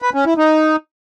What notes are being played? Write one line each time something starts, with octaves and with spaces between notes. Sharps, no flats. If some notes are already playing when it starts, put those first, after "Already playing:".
B4
C#4
E4
D#4